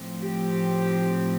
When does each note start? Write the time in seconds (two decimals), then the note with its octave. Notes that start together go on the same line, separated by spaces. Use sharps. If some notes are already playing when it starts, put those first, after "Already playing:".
Already playing: A2 F3 C4
0.21 G4